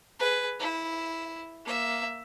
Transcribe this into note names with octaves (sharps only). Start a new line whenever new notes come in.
G#4 B4
E4
A#3 E5